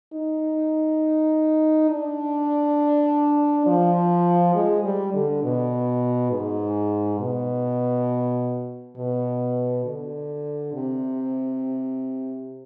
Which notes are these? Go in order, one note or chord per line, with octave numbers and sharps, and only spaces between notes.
D#4
D4
F3
G#3
G3
D3
B2
G#2
B2
B2
D3
C3